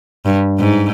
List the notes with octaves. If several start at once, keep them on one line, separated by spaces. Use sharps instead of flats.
G2
G#2